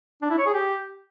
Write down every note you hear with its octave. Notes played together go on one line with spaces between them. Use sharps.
D4
E4
C#5
G#4
G4